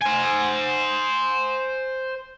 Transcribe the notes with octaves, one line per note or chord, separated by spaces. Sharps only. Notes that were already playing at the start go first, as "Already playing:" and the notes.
C5 G#5